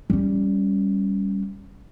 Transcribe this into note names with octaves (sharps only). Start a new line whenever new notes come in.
G3 C#4